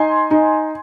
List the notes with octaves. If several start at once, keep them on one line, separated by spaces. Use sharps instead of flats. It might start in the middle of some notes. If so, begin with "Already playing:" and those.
Already playing: D#4 G#5 C6
D#4